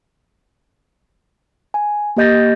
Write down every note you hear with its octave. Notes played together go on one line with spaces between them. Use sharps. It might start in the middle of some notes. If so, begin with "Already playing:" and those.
G#5
A#3 G4 D#5 G6 A6 A#6